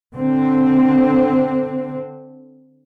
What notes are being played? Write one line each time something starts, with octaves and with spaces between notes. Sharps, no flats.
D3 C4